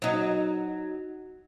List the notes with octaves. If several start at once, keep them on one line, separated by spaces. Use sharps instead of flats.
F#3 D#4